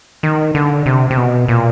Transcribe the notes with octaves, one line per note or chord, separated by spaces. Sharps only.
D#3
D3
C3
C3
B2
A#2